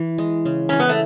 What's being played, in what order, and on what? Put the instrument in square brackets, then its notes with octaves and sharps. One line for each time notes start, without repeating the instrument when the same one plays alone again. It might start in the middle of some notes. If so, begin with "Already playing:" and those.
Already playing: [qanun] E3
G#3
C#3
[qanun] E3 [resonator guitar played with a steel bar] C#4
[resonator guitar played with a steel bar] B3
A3